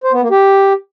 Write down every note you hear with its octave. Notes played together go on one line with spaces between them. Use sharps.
C5
B3
A#3
G4